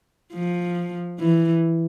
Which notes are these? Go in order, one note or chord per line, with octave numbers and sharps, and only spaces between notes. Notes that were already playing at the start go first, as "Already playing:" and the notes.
F3
E3